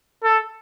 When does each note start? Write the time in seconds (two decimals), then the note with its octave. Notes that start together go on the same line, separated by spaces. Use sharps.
0.24 A4